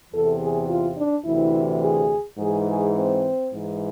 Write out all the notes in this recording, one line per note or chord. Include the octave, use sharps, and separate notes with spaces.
E2 C3 E3 A4
G#4
F4
D4
D2 C3 E3 E4
G#4
G#2 E3 G#4
G#4
C4
G#2 E3